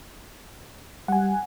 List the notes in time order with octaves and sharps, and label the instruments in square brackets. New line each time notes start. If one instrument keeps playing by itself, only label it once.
[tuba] G3 [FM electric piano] F#5 G#5